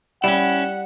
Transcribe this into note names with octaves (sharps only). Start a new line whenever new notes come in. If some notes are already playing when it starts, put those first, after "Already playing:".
G3 C#4 E4 F#5